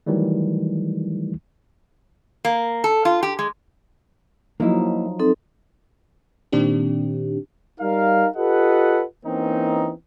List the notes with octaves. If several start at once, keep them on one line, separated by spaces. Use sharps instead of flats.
D#3 E3 F#3 G3 A3
A#3
A4
F4
G4
G#3
F3 F#3 A#3 D#4 E4
C4 D#4 A4
A#2 D#3 C4 D4 G4
G3 D#4 A#4 F5
F4 G4 A4 B4 D#5 F#5
E3 A#3 C4 C#4 D#4